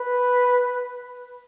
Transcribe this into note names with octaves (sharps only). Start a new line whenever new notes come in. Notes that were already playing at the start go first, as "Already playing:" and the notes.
Already playing: B4